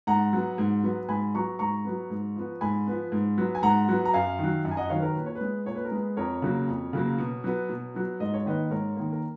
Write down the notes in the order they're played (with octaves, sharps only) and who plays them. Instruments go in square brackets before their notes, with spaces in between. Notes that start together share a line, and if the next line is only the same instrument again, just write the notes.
[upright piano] G#2 F#5 A#5
F#3 B3
G#2
F#3 B3
G#2 G#5 B5
F#3 B3 A#5 C#6
G#2 A#5 C#6
F#3 B3
G#2
F3 B3
G#2 G#5 B5
F3 B3
G#2
F#3 B3
G#5
G#2 F#5 A#5
F#3 B3
A#5
F#2 F5 G#5
D#3 F#3
F#2
G#5
D#5 F#5
D#3 F#3 C#5 F5
B4
A#4 C#5
A#2 B4
C#5
B4
G#3 B3
A#2 C#5
B4
A#4
G#3 B3 B4
F2 A#4 C#5
C#3 F#3 A#3
F2
C#3 F#3 A#3
B2
F#3 B3
B2
F#3 B3
G#2 D#5
C#5
D#3 A#3 B4 D#5
G#2 A#4 C#5
D#3 A#3
A#4